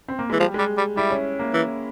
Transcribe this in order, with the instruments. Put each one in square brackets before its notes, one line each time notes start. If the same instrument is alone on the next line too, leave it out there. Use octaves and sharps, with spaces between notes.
[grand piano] C4
A#3
[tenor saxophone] E3 [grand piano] G#3
[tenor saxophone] F3 [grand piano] G3
[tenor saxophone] G3 [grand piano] G#3
[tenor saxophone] G3
[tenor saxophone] G3 [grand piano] E4
[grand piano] C#4
A#3
[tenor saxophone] E3